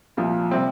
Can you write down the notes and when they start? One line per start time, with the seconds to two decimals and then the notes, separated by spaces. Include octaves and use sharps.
0.17 C2 A#2 F3
0.51 C3 G3 C4